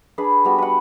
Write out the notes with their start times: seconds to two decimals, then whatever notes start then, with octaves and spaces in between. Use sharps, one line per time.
0.18 D4 G#4 B4
0.45 G3 B3 F#4
0.58 B4 F#5